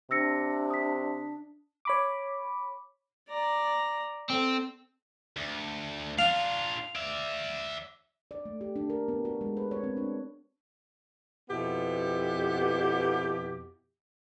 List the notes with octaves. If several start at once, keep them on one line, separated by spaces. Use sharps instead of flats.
C3 D4 E6 A#6 C#7
D#6 B6
C#5 B5 D6
D5 A#5
C4 A4
D2
D4 F4 F5
D5 E5
D5
A3
G4
D4
A#4
B3
F#4
G#3
B4
C#5
C4
D4
F2 B2 B3 E4 G4